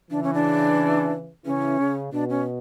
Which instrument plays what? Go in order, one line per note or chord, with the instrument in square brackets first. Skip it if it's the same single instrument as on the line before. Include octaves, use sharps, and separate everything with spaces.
[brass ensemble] C#3 E3 [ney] D4
[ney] C#4
D4
[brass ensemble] C#3 E3 [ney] C#4
[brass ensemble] C#3
[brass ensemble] B2 [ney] D4
[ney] C#4